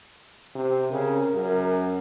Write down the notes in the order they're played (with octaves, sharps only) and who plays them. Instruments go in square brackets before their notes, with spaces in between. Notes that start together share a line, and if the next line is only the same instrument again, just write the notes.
[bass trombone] C3
[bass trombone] C#3 [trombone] A#4
[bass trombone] F#2